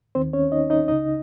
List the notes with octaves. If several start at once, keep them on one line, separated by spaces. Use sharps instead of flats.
D#2 D#3 C4 C5
C#4 C#5
D#4 D#5
D#4 D#5
C#2 C#3 D#4 D#5